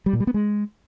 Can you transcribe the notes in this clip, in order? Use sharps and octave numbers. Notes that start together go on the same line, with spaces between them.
G3
A#2
G3
B3
G#3